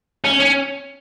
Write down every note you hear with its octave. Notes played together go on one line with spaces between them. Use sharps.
C#4
C#4